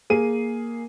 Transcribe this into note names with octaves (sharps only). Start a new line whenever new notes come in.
A#3 G#4 D#7